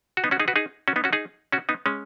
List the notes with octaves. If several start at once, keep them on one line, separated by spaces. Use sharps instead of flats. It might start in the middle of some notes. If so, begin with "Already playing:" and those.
F#4
B3 D#4
C#4 F#4
D#4 G#4
F#4 B4
D#4 G#4
C#4 F#4
B3 D#4
C#4 F#4
D#4 G#4
C#4 F#4
B3 D#4
G#3 C#4